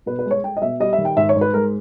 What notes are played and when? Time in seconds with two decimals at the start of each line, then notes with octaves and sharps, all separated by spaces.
0.06 B2 B4
0.19 B4
0.26 G#3
0.31 C#5
0.44 G#3 G5
0.57 D#5
0.62 B2 E5
0.80 G3 D#5
0.93 E5
0.98 D#3
1.05 G5
1.16 G#2 E5
1.29 C#5
1.35 G#2
1.41 B4
1.54 G#3 A#4